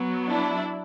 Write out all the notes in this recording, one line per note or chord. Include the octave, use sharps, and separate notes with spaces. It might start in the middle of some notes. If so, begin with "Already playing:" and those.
Already playing: F#3 B3
D4 E4